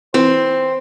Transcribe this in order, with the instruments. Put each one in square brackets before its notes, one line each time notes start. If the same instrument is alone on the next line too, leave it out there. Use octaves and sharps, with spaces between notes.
[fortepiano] E3 [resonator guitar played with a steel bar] C4 [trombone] C5